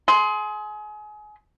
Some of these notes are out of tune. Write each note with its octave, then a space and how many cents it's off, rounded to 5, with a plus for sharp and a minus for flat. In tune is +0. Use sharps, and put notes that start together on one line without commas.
G#4 +30 C6 +0